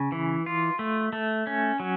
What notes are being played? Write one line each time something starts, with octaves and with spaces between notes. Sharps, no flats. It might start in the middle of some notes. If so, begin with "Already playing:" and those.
Already playing: C#3
E3
F4
A3
A3
C#4
F#3